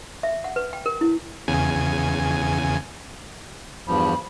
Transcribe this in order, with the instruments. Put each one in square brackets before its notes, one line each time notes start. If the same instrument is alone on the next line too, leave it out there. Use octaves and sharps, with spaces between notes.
[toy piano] E5
F#5
B4
G5
A#4
E4
[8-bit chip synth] E2 C#3 G#5
[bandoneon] E2 G2 F3 [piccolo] B5